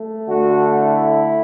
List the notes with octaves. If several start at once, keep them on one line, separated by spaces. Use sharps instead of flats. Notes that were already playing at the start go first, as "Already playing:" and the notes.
Already playing: A3
D3 A3 F#4
E4